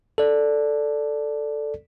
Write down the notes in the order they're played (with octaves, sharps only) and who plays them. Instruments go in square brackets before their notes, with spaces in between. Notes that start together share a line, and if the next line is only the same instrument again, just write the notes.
[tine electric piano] A4 D5